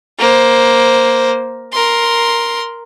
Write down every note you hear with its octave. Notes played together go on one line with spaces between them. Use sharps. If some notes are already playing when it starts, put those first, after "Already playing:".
A#3 C5
A#4 C6